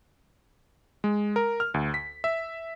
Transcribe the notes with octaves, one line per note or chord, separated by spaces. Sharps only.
G#3
A#4
F6
D2
B6
E5